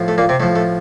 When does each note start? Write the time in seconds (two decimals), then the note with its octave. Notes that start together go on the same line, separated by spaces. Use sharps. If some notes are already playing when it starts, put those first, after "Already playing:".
Already playing: A2 F3
0.08 A3
0.18 A#2 A#3
0.29 C3 C4
0.40 A2 F3 A3
0.56 A3